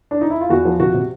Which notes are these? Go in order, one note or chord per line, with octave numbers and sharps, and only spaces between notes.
D4
D#4
E4
F4
E2 F#4
F3
C3 F#4
C3